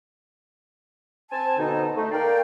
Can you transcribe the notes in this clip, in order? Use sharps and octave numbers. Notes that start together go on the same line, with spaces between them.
C4 G#5 A5
B2 D3 D#4
A3 D#4
A#4 D5 F5 G5